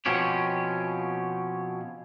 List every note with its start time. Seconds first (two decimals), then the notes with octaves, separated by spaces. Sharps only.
0.06 B2 F3 C4 C#4 G4